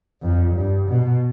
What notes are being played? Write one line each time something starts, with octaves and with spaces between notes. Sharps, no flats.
F2
G2
B2